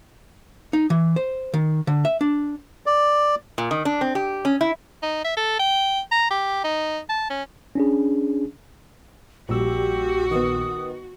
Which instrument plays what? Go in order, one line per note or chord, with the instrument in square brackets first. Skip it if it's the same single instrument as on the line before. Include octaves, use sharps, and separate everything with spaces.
[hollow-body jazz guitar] D#4
E3
C5
D#3
D3
E5
D4
[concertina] D5
[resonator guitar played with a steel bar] A#2
D#3
D4
C4
G4
C#4
E4
[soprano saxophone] D#4
E5
A4
G5
A#5
G4
D#4
A5
C#4
[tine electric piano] C#4 D4 G#4
[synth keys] A#1 A#2 E6 [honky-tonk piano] G3 [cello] F#4 [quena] G4
[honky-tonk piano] D#3 B3 [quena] D#6